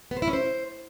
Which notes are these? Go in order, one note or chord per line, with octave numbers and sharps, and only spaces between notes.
B3
C5
E4
C#4
C5